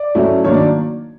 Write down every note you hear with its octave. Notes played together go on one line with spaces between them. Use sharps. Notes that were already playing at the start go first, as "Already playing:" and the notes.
Already playing: D5
F#3 A3 C#4 E4
D#3 F#3 A#3 D4 C#5
D5